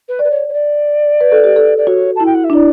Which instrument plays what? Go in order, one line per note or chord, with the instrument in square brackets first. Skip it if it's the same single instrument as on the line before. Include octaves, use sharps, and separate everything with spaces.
[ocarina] B4
[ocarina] B4 [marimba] D5
[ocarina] C#5
C#5
D5
[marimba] B4
A4
G4
A4
[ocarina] D5
[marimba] F#4 [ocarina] C#5
[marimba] E4 [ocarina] A5
[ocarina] G5
F#5
E5
[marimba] D4
[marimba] E4 [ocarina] D5